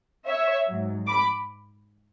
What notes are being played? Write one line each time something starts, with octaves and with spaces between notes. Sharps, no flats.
C#5 E5
G#2 F#3
B5 D6